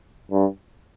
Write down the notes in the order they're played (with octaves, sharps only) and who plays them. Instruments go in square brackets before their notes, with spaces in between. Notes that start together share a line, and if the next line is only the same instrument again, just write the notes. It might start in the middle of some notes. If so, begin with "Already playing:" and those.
[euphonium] G2